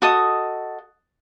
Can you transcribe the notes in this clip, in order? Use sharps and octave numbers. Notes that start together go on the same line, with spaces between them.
F#4 A4 D#5 D#6